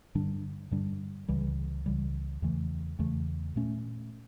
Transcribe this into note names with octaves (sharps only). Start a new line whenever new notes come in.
G2 D3 G3 D4
G2 D3 G3 D4
C#2 C#3 E3 G3
C#2 C#3 E3 G3
E2 C#3 E3 A3
E2 C#3 E3 A3
A#2 A3 C#4